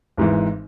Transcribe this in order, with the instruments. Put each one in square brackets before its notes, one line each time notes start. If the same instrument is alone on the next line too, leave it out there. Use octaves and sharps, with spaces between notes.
[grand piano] G#1 G#2 E3